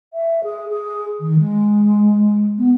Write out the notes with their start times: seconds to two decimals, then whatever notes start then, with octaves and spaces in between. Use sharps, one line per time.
0.13 E5
0.44 G#4
0.69 G#4
1.20 D#3
1.39 G#3
2.58 B3